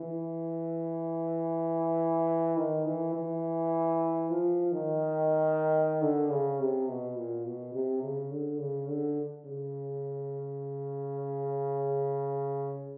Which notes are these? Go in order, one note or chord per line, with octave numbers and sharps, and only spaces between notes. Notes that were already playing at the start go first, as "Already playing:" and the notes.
Already playing: E3
D#3
E3
E3
F3
D#3
D3
C#3
C3
B2
A#2
B2
C3
C#3
D3
C#3
D3
C#3